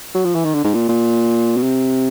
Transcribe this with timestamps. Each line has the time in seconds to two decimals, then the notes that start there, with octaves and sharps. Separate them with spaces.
0.15 F#3
0.25 F3
0.35 E3
0.45 D#3
0.54 D3
0.64 G#2
0.74 A#2
0.89 A#2
1.57 B2
1.63 C3